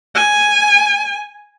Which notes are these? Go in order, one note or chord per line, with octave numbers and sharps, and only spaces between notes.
G#5